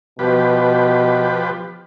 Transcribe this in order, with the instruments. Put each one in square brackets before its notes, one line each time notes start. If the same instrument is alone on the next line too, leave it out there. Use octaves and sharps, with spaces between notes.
[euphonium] B2 [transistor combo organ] F3 G4 B4